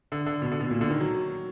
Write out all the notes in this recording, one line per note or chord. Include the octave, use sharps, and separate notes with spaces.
D3
D3
B2
D3
B2
A#2
D3
D#3
F#3